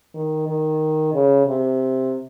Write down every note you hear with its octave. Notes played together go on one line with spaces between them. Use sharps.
D#3
D#3
C#3
C3